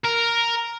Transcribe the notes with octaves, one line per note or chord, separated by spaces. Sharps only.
A#4